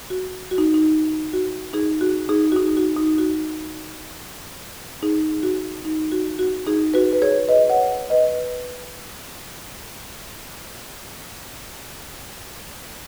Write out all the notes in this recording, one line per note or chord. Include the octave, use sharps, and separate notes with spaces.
F#4
F#4
D#4
D#4
F#4
D#4 G#4
F#4
D#4 G#4
F#4
D#4
F#4
D#4
F#4
D#4 G#4
F#4
D#4
F#4
F#4
D#4 G#4
F#4 B4
B4
G#4 C#5
B4 D#5
C#5 F#5
B4 D#5